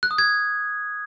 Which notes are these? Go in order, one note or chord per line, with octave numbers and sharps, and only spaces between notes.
F#6
D#6
G#6